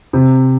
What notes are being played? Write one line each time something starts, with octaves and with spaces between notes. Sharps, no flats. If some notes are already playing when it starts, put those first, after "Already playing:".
C3